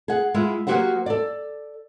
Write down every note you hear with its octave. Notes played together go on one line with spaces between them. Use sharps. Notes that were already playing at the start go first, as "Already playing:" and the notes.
G#4 F#5
G#3 E4 F4
F#3 A#3 F#4 G4 C5 F#5
A4 D5